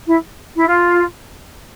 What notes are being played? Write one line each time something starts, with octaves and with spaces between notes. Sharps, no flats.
E4
E4
F4